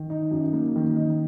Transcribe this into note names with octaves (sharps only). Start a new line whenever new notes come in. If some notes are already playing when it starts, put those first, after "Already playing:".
Already playing: D#3
D#4
F#2
A#3
D#3
D#4